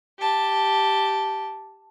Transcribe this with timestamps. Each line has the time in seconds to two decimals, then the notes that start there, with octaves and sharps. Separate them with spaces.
0.19 G4 A5